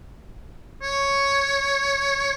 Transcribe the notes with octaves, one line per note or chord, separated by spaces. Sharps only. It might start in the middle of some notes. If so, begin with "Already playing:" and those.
C#5